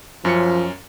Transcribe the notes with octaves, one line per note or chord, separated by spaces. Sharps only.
F#2 F3 C#4 C#7